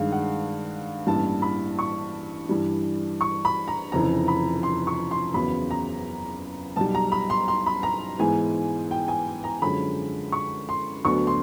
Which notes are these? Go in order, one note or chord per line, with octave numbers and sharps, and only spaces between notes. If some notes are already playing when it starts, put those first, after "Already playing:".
Already playing: G2 D#3 G#3 F5
F#5
A1 G2 E3 G3 A#3 A5
B5
C#6
G2 E3 G3
C#6
B5
A#5
F1 F2 C#3 E3 A#5
B5
C6
C#6
C6
F#1 E2 C#3 F#3 B3 B5
A#5
B1 B2 G3 A5
A#5
B5
C6
C6
B5
A#5
G#2 E3 G#3 B3 G#5
G5
G#5
A#5
F#2 D3 F3 G#3 C#4 B5
C#6
C6
D2 D3 F#3 B3 D4 C#6
C6